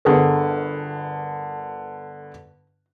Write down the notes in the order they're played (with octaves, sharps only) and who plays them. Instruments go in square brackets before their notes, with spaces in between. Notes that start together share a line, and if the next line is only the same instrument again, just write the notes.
[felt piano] G1 D3 G#4 A#4